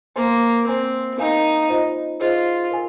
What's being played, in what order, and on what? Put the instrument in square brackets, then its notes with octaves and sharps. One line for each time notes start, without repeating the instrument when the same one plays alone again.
[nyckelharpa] A#3 [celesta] C5 G#5 C6
[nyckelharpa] C4 [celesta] C5 G#5 C6
[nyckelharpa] D#4 [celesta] A#4 F5 G#5
[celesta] F4 C5 D#5
[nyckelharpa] F4 [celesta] G#4 C5 D#5
[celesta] A#4 G#5